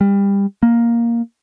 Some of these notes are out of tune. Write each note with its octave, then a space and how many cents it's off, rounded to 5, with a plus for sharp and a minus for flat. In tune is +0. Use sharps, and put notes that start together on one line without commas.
G3 +25
A#3 +5